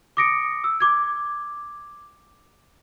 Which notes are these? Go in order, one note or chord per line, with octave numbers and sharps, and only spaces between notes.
D6 D#6 A#6 C#7 D7
E6
D6 G#6